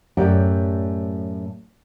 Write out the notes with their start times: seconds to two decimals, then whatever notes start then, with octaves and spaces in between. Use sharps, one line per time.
0.17 F#2 A2 A3 G4 D5